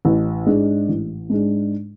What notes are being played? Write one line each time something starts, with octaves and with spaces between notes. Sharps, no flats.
A1
G#2 G#3 D4
A1
G#2 G#3 D4